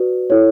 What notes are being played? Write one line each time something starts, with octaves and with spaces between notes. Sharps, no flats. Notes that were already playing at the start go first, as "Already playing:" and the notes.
Already playing: F#4 B4 D5
E4 A4 C#5